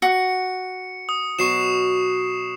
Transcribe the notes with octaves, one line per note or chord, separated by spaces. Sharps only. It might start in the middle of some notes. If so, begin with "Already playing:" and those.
F#4 C#7
D#6
B2 F#3 C#6 C7 E7